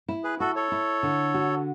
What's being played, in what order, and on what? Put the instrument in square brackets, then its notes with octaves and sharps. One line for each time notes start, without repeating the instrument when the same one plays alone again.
[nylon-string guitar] E4
[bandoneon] G#4 B4
[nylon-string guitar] E4 [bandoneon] F#4 A4
[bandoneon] A4 C#5
[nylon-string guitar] E4
D3
F#4